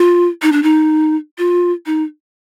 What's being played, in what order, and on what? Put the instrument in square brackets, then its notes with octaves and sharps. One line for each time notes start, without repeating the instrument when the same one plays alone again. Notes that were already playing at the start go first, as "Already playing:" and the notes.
Already playing: [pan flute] F4
D#4
D4
D#4
F4
D#4